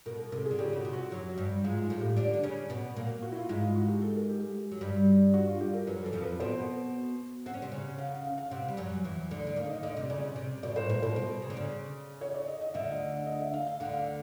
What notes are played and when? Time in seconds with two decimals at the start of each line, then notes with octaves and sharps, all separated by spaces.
0.06 B2 A#4
0.19 A#4
0.32 C3 A4
0.45 G#4
0.51 D3
0.58 C#3 G4
0.73 C#3 F#4
0.85 C3
0.93 F#4
1.11 F#2 F#3
1.38 G2 G3
1.64 G#2 G#3 F4
1.82 F4
1.90 A2 A3
1.99 G4
2.16 D3 D4
2.34 D4
2.43 C#3 C#4
2.70 B2 B3
2.97 A#2 A#3
3.22 F#4
3.32 E4
3.36 F4
3.49 G#2 G#3 E4
3.62 F4
3.76 F#4
3.88 G4
4.02 A4
4.15 A#4
4.29 G4
4.72 F#3
4.81 G2 G3
5.34 F#4
5.48 F4
5.60 G4
5.74 A#4
5.87 F#2 F#3 B4
6.04 E3 A4
6.13 F2 F3
6.23 B4
6.40 B2 B3 C5
7.46 C4 F#5
7.54 C#4
7.62 C3 C4
7.72 C#3 C#4
7.98 F5
8.11 F#5
8.25 F5
8.38 F5
8.51 C3 C4 F#5
8.68 G3
8.77 F#2 F#3
9.04 E2 E3
9.31 D2 D3
9.47 D3
9.56 D#2 D#3 F5
9.70 D#5
9.83 D2 D3 D#5
9.97 C3
10.10 C#3 D5
10.36 C3
10.63 B2 D5
10.76 A2 C5
10.89 A#2 B4
11.02 B2 C5
11.16 B2
11.42 C#3
11.50 D3
11.57 C#3
12.21 C#5
12.34 D5
12.48 D#5
12.61 D#5
12.74 D2 D3 E5
12.92 D#5
13.26 D#5
13.41 E5
13.54 F5
13.67 F5
13.80 D2 D3 F#5
13.97 F5